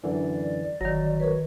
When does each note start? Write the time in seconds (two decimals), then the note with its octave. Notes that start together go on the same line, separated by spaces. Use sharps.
0.04 F#2 D3 E3 D5
0.81 G1 D#3 F#3 A#6
1.20 A#4 B4 C#5